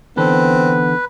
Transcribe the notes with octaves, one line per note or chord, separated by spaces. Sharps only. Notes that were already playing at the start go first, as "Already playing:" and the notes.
D3 E3 B3 C4 A4 B4